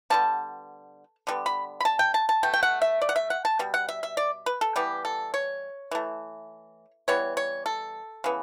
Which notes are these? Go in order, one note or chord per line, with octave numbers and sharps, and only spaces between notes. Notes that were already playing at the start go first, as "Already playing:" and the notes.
D3 G3 B3 A5
D3 G3 B3
B5
B5
A5
G5
A5
A5
B2 A3 G5
G5
F#5
E5
D5
F#5
E5
F#5
A5
B2 G3
F#5
E5
E5
D5
B4
A4
E3 G3 B3 G4
A4
C#5
E3 A3
E3 G3 B3 C#5
C#5
A4
C#3 E3 B3